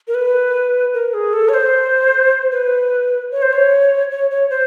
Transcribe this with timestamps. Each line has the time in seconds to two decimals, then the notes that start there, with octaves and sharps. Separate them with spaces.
0.08 A#4
0.14 B4
0.94 A#4
1.14 G#4
1.33 A4
1.49 C#5
1.54 C5
2.52 B4
3.32 C#5
3.42 C5
3.53 C#5
4.11 C#5
4.31 C#5
4.50 C5